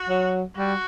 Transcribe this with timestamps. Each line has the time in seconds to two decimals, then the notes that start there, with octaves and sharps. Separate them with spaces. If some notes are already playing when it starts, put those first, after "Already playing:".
Already playing: F#4
0.09 F#3
0.57 G3 F#4